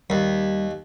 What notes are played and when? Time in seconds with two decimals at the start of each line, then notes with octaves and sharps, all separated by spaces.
0.10 D#2 G3